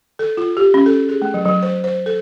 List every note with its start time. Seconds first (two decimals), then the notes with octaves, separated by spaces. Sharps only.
0.19 A4
0.37 F4
0.57 G4
0.74 C#4
0.86 A4
1.09 G#4
1.22 A3
1.34 F#3
1.45 F#3
1.62 C5
1.84 C5
2.06 A4